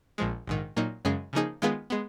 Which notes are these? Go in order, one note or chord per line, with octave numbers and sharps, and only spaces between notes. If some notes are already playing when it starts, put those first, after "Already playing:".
A#1 A#2 F3 G#3
A#1 G#2 D#3
A#2 F#3 A#3 D#4
F#2 C#3 G#3 C#4 G#4
C#3 F3 A#3 D#4 G#4
D#3 G#3 B3 F4 G#4
G#3 B3